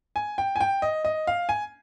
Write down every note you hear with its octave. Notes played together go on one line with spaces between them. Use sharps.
G#5
G5
G#5
G5
D#5
D#5
F5
G#5